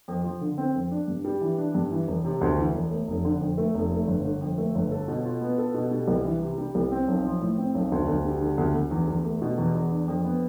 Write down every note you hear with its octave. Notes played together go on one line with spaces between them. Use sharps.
F2
F3
D3
C4
F2
D4
G2
G3
E3
D4
G2
E3
E1
C3
D2
E3
E1
A3
F1
D3
F2
A3
F1
A3
G1
D3
F2
A3
G1
A4
B2
F4
B3
A4
B2
G3
C2
E3
C3
G3
C2
C4
B1
F3
A2
C4
B1
D2
D2
G3
D3
D2
D2
E2
E2
A3
B2
E2
E2
D4
F2
B3